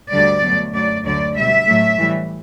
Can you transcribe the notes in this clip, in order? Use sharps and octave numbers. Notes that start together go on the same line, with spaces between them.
D2 D3 G3 D5
B2 F#3 A3
F#2 F#3 A3 D5
D2 D3 F#3 D5
B2 G3 E5
A2 F#3 A3
A2 E3 G3